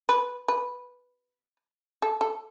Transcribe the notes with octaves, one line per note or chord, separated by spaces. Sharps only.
B4
B4
A4
A4